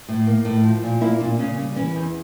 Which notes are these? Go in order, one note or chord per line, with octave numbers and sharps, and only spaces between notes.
A2
A#3
A2
F3
A#2
A#3 E4
A#2 D4
C#3 C#4
G3
E3 C#4
E2